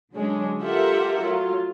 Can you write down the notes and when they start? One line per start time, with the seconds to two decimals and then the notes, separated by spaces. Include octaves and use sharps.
0.14 D3 F#3 G#3 C#4 D4
0.62 F4 G4 A4 A#4 E5 F#5
1.21 F#3 A3 F4